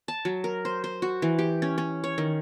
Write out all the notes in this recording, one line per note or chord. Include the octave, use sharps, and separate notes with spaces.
A5
F#3
A#4
C5
C5
F#4
E3
G4
C#4
C#4
C#5
D#3